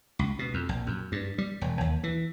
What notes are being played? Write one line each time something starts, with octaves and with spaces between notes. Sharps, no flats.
C#2
B2
F2
A#1
F#2
G2
G3
E1
D#2
E3